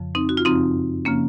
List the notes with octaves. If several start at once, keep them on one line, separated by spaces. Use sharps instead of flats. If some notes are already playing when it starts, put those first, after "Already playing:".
Already playing: F2 C#3 F3
C4 D#4
F#4
F4
F#2 C#3 F3 C4 D#4
C#3 F3 A#3 C#4